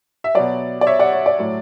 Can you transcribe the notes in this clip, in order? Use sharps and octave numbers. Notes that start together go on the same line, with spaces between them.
E5
B2 F#3 D5
D5
C#5 E5
D5 F#5
C#5
D5
A2 F#3